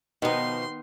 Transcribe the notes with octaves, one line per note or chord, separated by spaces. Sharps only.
B2 D#3 F3 B3 D#4 C6